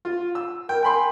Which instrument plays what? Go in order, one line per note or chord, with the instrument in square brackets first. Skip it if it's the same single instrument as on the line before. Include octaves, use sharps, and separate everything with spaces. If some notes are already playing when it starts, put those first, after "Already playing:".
[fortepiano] F4
E6
[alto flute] A#4 [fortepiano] G5
[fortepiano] G5 B5 C6 [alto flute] G#5